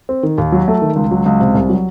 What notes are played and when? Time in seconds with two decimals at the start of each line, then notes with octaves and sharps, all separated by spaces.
0.09 C4
0.23 D#3
0.38 D#2
0.52 F#3
0.68 A3
0.82 D#3
0.96 C#2
1.11 F#3
1.26 C#2
1.40 C3
1.55 C2
1.69 F#3